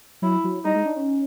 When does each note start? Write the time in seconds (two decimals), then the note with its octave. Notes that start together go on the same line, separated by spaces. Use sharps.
0.22 F#3 E4
0.44 F#3
0.65 G3 D#4
0.75 G#3
0.86 D4
0.96 C#4